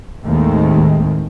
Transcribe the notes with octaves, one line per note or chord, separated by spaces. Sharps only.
D#2 A2 D#3 G#3 A3 C4